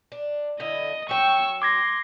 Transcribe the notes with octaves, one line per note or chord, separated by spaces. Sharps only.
D4
D3 E4 D#5
F#3 G5 C#6 E6
C6 D6 G#6 A#6